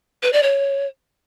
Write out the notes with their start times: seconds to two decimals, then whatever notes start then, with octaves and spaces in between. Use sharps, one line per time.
0.23 B4
0.33 D5
0.43 C#5